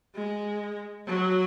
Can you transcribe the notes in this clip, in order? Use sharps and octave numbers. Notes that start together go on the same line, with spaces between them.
G#3
F#3